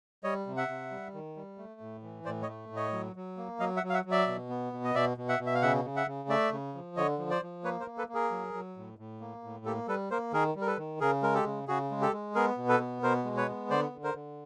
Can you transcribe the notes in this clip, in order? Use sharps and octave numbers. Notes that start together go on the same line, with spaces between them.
G3 C#5 D#5
C3
E5 F#5
C3
G3
D#3
G3
A3
A2
E3
A2 C5 D5
C#5 D#5
A3
A2
C#5 D#5
F#3
F#3
A#3
F#3 D#5 F5
E5 F#5
F#3
F5
E5 F#5
F#3
D5 E5
B2
B3
B2
D#5
B2 D5 E5
B2
E5 F#5
B2
E5
F5
C#3 E5 F#5
C#3
E5 F#5
C#3
A3 D5 E5
C#3
F3
D3 C#5 D#5
F3
C5 D5
F3
A#3 B4 C#5
A#4 C5
A#3
A4 B4
A#3
G#4 A#4
F#3
F#3
A2
A2
A#3
A2
A#3 G4 A4
G3 A4 B4
A#3 A#4 C5
D#3 G#4 A#4
G3
A#4
A4 B4
D#3
C#3 G#4 A#4
G#3 A#4
G4 A4
C#3
C#3 F#4 G#4
G#3
G4 A4
G#3
B3 G#4 A#4
B2
A4 B4
B3
B2 A#4 C5
G#3
B4 C#5
B3
D3 C5 D5
D3
A#4 C5
D3